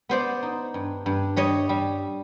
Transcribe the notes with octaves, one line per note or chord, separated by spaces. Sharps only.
B3 C5 D5
D#4
G2
G2
G3 C#5 D#5
G3